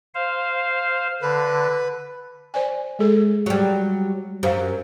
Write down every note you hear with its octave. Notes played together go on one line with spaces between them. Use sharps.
C5 F5
D3 B4
C5 D5 G#5
G#3 G#4 A4
F#3 G3
F#2 G4 C5 F5